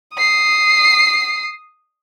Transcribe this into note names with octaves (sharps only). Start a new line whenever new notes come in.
D#6 C7